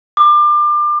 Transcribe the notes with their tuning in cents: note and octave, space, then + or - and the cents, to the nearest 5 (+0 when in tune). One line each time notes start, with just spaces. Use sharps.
D6 +30